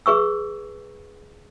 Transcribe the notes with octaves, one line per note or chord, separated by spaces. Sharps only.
G#4 B4 C#6 E6